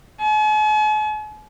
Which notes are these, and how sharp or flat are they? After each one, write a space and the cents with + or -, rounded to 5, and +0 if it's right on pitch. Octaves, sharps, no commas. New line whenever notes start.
G#5 +45